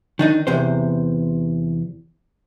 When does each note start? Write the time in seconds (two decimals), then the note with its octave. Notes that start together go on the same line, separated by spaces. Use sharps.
0.19 D#3 D4 D#4
0.47 E2 C3 C5